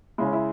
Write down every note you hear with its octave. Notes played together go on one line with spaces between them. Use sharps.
C#3 G#3 E4
C#4
E4